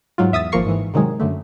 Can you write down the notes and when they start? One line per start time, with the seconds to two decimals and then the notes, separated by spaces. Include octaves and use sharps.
0.18 G#2 F#3 F4
0.32 E2 E5 D#6 E6 A6
0.52 G#1 F3 A#3 A#4 C#6 C7
0.66 G#2 E3
0.94 C3 D#3 F#3 G#3
1.20 F#2 D3 A3